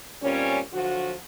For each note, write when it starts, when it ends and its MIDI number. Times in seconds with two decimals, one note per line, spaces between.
0.22 0.59 46
0.22 0.59 55
0.22 0.59 60
0.22 0.59 61
0.73 1.14 50
0.73 1.14 53
0.73 1.14 54
0.73 1.14 66